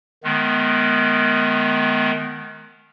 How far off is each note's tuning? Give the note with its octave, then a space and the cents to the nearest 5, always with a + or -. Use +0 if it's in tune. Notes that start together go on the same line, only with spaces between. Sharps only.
D#3 -5 G#3 +40 B3 +0